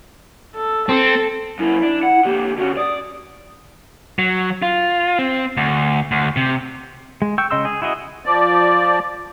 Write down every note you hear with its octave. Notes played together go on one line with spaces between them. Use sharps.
A4
C4 A4 A5
F#2 A#3 E4
D4
F#5
D3 A#3 G4
D3 C#4 F#4
D5 D#6
F#3
F4
C4
D2
D2
C3
G#3
G5 C#6 E6
C#3 D#5 C6 E6
G#4
E4 F#4 G#4 D#5
F3 D5